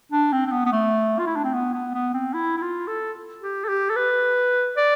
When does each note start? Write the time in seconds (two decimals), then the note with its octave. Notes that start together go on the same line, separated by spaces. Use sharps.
0.12 D4
0.32 C4
0.47 C4
0.52 B3
0.66 B3
0.72 A3
1.19 F4
1.27 E4
1.36 D4
1.44 C4
1.53 B3
1.74 B3
1.94 B3
2.13 C4
2.34 E4
2.57 E4
2.62 F4
2.88 A4
3.42 G4
3.65 A4
3.68 G4
3.90 A4
3.96 B4
4.77 D5